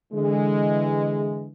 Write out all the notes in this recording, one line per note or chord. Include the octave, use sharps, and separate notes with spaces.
D3 E3 G#3